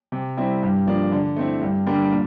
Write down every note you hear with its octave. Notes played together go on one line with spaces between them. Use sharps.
C3
G3 C4 E4
G2
F3 A#3 D4
D3
A3 C4 E4
G2
D3 G3 A#3 D4
A#2